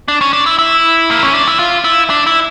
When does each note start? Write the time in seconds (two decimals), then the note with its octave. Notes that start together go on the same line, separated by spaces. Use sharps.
0.08 D4
0.21 C#4
0.33 D4
0.46 E4
0.59 E4
1.11 A#3
1.23 C#4
1.35 D4
1.48 E4
1.59 F4
1.84 E4
2.10 D4
2.27 E4